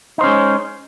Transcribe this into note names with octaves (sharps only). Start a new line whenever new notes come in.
G#3 C#4 D#4 C5